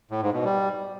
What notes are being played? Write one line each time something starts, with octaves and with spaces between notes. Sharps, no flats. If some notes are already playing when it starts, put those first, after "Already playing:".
A2
G#2
B2
G3